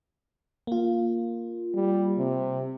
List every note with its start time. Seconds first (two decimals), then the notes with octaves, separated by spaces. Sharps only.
0.67 A#3 F4
1.74 G3
2.18 C3